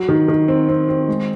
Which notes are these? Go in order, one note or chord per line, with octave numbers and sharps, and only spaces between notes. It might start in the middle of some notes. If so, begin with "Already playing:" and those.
Already playing: F#3
D#3
D#3
C4
C4
C4
G#3